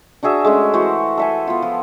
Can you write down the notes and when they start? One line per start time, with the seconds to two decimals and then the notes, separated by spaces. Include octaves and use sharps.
0.23 D4 F#4 G#4 E5
0.45 G#3 A3 C#4
0.74 E3 F#4 C5
1.17 A4 E5 G#5
1.47 B3 F4
1.62 F3